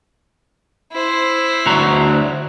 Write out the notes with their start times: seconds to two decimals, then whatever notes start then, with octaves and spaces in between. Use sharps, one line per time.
0.92 E4 C5
1.66 D2 F#4 A#5